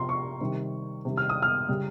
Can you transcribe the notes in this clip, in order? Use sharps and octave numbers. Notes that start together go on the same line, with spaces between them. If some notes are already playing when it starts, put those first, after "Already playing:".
Already playing: C3 F3 A#5 C6
C#6
C3 D#3 G3
C3 D#3 G3
F6
D#6
F6
C#3 G3